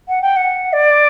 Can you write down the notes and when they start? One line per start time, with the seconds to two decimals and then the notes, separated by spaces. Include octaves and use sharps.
0.08 F#5
0.21 G5
0.36 F#5
0.72 D5